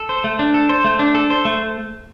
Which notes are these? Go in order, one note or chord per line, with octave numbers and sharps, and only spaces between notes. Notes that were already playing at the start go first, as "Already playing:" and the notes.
Already playing: A4
C5
A3
D4
A4
C5
A3
D4
A4
C5
A3